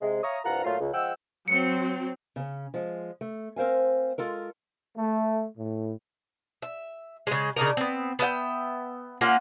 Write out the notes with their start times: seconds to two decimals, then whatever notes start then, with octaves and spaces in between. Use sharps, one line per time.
0.01 C3 G#3
0.22 C#5 E5 F5 A#5 C#6 D#6
0.44 C2 G2 F3 F4 F#5 A#5
0.64 A#2 F#3 A3 F4
0.80 C#2
0.94 F3 G#3 F#5 G5 E6
1.48 F#3 C4 C#7
2.36 C#3 C#4
2.74 F3 G#3
3.21 A3
3.56 C4 A#4 C5 F5 G#5
4.18 G#3 F4 A4 A#4
4.97 A3
5.58 A2
6.62 E5
7.27 C#3 G#3
7.56 C#3 D4 D#4 A#4
7.77 B3 C4
8.19 B3 E5 F5 G5
9.21 A#3 C#4 F4 F#5